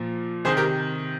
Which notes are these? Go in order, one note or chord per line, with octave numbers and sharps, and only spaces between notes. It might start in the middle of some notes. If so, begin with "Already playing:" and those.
Already playing: A#2 F3
C3 D#3 G#4 C5
G4 A#4